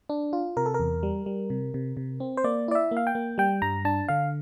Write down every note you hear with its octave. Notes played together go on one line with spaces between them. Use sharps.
D4
F4
C3 A#4
A4
A#4
E2
G3
G3
C3
C3
C3
C4
C5
A#3 D5
E4 D5
E5
A#3
F5
G5
A#3
G3 G5
G2 A#5
D4 A5
D3 F5